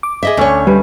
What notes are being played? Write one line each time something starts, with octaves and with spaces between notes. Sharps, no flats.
D6
G#4 D#5 E5
D2 A3 C#4 D4 C#5
G3 B4